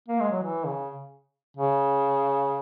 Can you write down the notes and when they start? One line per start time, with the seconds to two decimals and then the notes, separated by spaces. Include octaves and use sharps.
0.08 A#3
0.20 G#3
0.31 F#3
0.42 E3
0.66 C#3
1.57 C#3